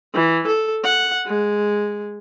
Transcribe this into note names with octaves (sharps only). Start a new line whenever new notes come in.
E3
A4
F#5
G#3